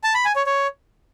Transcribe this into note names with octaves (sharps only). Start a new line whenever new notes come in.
A5
B5
G#5
C#5
C#5